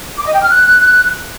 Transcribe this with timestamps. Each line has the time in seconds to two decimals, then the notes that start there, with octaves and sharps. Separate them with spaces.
0.18 D6
0.26 D#5
0.34 G5
0.42 F6
0.50 F#6